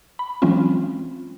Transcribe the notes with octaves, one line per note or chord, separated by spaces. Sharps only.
B5
E3 F#3 G#3 C4 C#4 F4